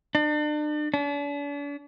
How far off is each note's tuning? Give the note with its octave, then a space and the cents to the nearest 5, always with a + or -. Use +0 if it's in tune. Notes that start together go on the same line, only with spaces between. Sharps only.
D4 +40
D4 -40